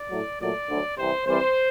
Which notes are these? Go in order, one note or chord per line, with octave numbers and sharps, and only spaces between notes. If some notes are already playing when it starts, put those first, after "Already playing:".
Already playing: D5
A2 F#3 A3
A#2 F#3 A3 D5
D2 D3 F#3
C2 C3 E3 C5
C2 C3 E3 G3 C5